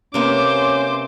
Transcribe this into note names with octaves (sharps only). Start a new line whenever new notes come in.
C3 A#3 B3 C#4 C5 D6